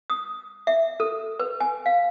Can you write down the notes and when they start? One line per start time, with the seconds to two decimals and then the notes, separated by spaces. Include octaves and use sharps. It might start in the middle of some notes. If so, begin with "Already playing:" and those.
0.10 D#6
0.67 E5
1.00 A4
1.40 B4
1.60 G#5
1.86 F5